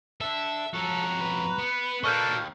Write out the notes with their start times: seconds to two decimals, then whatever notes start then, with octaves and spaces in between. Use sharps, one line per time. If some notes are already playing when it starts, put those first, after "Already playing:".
0.21 D4 A4 E5
0.74 F2 C#4 F#4 A4 A#5
1.21 B4
1.58 B3
2.04 A#3 D4 F#4 A4 D#5 C#6 F6 G6
2.28 D#2